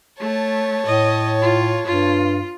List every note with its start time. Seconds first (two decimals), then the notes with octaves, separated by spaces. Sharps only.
0.20 A3 C#5 A5
0.86 A2 D#5
1.41 F4
1.86 G2 F4